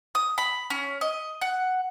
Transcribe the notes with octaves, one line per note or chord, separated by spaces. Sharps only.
D#6
B5
C#4
D#5
F#5